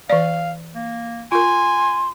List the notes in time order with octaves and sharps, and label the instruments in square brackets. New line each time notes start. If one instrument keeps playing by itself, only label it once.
[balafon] E3 D5 [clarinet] F5
[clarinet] A#3
[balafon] F4 A#4 [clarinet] G#5 [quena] C6